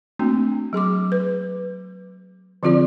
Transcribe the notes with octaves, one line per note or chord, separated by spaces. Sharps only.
A3 A#3 C4 D4 F#4
F#3 G#4 C6 D6
B4
D3 F3 C4 F4 G#4 D5